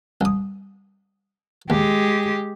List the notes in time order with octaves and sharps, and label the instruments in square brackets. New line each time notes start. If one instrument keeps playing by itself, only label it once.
[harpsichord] C2 D#6
[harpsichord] D#2 [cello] G#3 G4